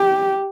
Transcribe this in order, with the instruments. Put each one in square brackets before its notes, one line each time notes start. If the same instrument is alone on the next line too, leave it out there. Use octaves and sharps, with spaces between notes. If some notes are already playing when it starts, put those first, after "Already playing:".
Already playing: [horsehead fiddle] G4